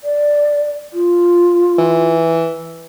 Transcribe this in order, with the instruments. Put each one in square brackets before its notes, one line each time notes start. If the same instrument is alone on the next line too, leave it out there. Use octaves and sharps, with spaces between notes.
[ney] D5
F4
[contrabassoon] E3